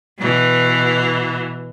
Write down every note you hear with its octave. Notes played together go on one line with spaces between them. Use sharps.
B2 E3